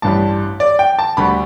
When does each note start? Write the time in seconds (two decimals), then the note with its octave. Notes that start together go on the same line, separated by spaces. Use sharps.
0.02 A1 G2 G3 A5
0.60 D5
0.79 G5
0.99 A5
1.17 D2 D3 G3 B5